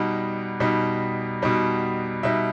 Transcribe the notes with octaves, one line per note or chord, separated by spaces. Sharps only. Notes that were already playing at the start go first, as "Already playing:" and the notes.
Already playing: B2 G3 D#4 F#5
B2 G3 D#4
B2 G3 D#4
B2 G3 D#4 E5